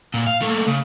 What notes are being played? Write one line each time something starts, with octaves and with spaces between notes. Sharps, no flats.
A#2
F5
A3 A#3
C#3